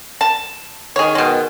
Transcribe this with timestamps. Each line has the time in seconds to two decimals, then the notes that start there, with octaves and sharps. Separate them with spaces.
0.21 A5
0.96 D#3 G#4 C#5
1.15 B2 G#3